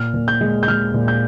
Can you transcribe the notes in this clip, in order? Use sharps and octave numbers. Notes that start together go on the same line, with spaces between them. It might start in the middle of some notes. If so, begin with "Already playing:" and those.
Already playing: A#2 F6
A#2
G6
G#3
G6
G#3 F6
A#2
G6